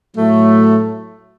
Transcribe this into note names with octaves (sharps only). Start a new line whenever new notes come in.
A2 F#3 A3